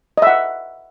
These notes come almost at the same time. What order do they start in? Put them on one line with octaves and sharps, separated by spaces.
D#5 E5 F#5